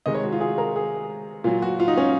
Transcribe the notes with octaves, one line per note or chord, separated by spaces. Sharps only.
C3 D#3 G#3 D#5
C#5
F#4
F4
G#4
A#4
G#4
A#2 F#3 F4
F#4
F4
D#4
C#4